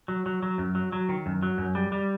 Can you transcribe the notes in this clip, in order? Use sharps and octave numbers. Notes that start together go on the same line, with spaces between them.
F#3
F#3
F#3
F#2
F#3
F#3
D#3
F#2
F#3
F#2
G3
G3